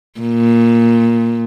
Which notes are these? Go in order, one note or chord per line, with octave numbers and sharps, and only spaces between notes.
A#2